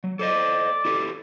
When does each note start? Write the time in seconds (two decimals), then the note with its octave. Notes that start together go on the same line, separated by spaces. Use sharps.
0.04 F#3
0.19 A4 C5 D5 D#5
0.85 E4 G4 A4